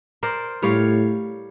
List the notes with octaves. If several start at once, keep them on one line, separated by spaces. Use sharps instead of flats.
A#4 C5 D5
A2 G3 C#5 F5